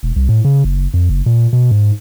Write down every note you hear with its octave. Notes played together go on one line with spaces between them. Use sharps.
E1
C2
A2
C#3
F#1
F2
F#1
A#2
B2
G#2